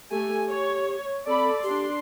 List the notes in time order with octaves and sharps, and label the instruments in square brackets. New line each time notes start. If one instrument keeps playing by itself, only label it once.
[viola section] A3 G#5 [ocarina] G4
[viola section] C#5
[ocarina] C4 [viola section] A4 D5 B5
[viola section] D4 C6 [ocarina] G4